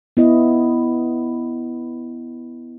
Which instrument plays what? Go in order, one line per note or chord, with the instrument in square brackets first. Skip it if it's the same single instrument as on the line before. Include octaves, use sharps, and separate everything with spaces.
[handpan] B3 E4 D#5